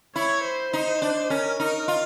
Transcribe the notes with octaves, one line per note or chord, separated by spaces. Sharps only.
E4 C#5
C5
D#4
D4
C#4 A#4
D#4 A#4
F4